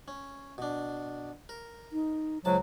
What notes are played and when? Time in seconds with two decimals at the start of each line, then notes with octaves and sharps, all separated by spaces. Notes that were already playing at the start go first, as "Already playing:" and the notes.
0.08 C#4
0.58 B2 D4
1.49 A#4
1.92 D#4
2.45 C#2 F#3 C5 A5